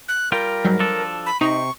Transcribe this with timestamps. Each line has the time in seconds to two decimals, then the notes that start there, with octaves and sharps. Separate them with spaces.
0.08 F#6
0.32 G3 F4 A#4 G5
0.65 G#2 F#3 G3
0.79 F3 D4 A4
1.26 B5
1.41 C3 D#4 C#6